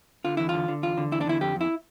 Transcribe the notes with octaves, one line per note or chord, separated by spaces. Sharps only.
D3 F4
E2 E4
D3 F4
D3
E2 F4
D3
E2 E4
D4
D3 E4
F2 G4
F2 E4